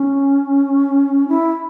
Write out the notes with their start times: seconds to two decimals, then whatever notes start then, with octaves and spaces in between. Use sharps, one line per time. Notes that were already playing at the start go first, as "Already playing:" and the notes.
Already playing: C#4
1.28 E4